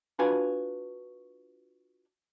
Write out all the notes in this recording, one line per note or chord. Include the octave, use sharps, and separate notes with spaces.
D4 F4 F#4 B4 F5 G#5